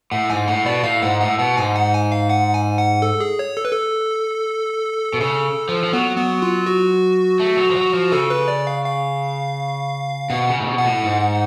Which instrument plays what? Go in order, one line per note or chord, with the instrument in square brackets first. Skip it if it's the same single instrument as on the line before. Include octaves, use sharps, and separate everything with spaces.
[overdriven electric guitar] A2 [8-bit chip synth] F#5
[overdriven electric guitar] G#2 [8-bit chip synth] G#5
[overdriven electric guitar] A2 [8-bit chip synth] F#5
[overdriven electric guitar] B2 [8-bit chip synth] D5
[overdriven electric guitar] A2 [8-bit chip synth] F5
[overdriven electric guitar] G#2 [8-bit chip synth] F#5
[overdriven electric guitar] A2 [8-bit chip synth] F#5
[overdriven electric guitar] B2 [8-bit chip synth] F#5
[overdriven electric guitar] G#2 [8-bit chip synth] G#5
[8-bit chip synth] F#5
G#5
F5
F#5
G#5
F#5
A4
G#4
C#5
A4
B4
A4
[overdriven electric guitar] B2
[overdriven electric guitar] C#3 [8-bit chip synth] A4
[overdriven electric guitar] F3
F3
[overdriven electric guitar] F#3 [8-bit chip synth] B3
[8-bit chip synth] B3
F4
F#4
[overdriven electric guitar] A3
F#3
F3
F#3
F3
[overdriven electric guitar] C#3 [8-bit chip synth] A4
[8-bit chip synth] B4
D5
F5
F5
[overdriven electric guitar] B2 [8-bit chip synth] F#5
[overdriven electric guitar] C#3
A2
B2
[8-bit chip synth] F#5
[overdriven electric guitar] A2
G#2